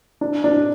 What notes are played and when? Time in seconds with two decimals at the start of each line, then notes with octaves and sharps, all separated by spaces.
0.21 D4
0.44 D4